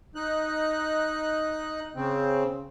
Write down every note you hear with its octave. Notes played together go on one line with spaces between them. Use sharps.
D#4 F#6
C#3 C4